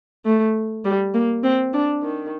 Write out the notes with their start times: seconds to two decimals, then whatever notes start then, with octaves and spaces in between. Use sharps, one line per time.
0.25 A3
0.85 G3
1.14 A#3
1.44 C4
1.73 D4
2.03 D#3